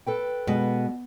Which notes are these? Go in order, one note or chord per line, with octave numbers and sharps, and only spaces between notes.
A4 B4 G5
B2 G#3